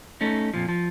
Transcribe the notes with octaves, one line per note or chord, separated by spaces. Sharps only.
A3 C#4 D#4
F2 A#2 F3
F3